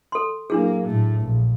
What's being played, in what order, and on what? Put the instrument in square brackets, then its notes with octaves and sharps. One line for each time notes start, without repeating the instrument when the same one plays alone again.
[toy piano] A4 C6
[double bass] F#3 A#3 [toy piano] D4 E4 G#4
[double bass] A2 A3
A#1